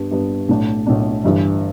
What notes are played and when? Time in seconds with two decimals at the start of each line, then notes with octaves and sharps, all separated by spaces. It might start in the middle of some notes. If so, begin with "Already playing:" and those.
Already playing: G2 G3 B3 D4
0.11 G2 G3 B3 D4
0.48 B1 A2 A3 D4
0.87 B1 A2 A3 D4
1.24 G1 G2 E3